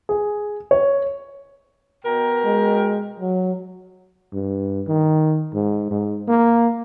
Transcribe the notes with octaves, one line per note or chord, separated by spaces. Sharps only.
G#4
C#5
B2 A#4 G5
G#3
F#3
G2
D#3
G#2
G#2
A#3